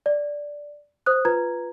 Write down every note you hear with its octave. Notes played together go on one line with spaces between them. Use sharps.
D5
C5 D#6 F#6
F4 B4 A#5 G#6